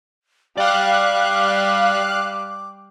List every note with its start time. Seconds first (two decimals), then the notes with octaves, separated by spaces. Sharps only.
0.58 G3 D5 F5 G5 D6 F#6